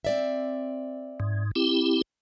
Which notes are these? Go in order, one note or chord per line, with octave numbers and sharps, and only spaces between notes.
C4 D5 E5
G#2
C4 E4 G4